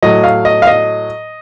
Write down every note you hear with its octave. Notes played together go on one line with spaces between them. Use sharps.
A2 F#3 D#5
F5
D#5
F5
D#5